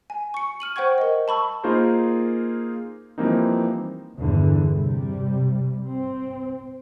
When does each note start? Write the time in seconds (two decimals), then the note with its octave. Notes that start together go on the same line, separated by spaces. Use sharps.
0.10 G#5
0.34 C#6 C#7
0.60 F6 D#7 F#7
0.76 C5 F#5 G5 C#6 G#6
0.98 A#4 D#5
1.28 A5 B5 C#6 E6
1.64 A#3 D#4 F4 G#4 A#4 C5
3.18 E3 F3 G3 A#3 C4 D#4
4.16 E2 G2 D3 E3
4.73 C3 G3
5.85 C4